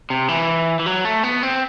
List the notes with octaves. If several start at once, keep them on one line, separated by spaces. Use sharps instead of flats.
C3
E3
E3
F#3
A3
B3
C4